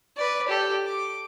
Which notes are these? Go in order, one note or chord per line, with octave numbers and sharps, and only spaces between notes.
B4 D5
G4 A4
D6